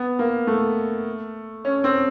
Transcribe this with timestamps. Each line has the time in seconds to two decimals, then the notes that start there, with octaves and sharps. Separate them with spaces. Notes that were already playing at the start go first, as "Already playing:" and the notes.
Already playing: B3
0.19 A#3
0.47 A3
1.65 C#4
1.84 C4